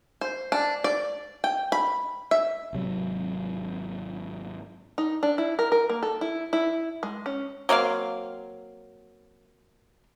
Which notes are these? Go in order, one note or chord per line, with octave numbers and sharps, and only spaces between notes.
C5
D4
D5
G5
B5
E5
G#1 C3 F#3
D#4
D4
E4
A#4
A#4
A#3
A4
E4
E4
G#3
C#4
F#3 A#3 C4 F5